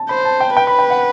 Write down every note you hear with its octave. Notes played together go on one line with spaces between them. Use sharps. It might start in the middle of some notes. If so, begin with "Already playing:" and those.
Already playing: A5
C5 B5
A5
G5
B4 G5
B5
G5
F#5